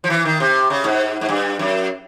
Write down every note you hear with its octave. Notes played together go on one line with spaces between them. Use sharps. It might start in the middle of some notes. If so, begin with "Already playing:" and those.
F3
E3
D#3
C3
C#3
G#2
G#2
G2
F#2